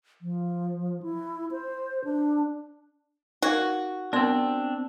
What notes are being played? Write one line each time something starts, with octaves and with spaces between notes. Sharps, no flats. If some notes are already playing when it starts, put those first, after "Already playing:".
F3
E4
C5
D4
D#4 F#4 A#4 F5
B3 C4 D4 A#4 C6